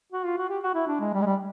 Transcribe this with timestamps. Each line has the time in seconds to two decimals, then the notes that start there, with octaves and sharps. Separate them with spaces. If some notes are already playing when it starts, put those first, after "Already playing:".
0.12 F#4
0.25 F4
0.38 F#4
0.50 G4
0.63 F#4
0.75 E4
0.88 D4
1.00 G#3
1.14 G3
1.22 G#3
1.26 G3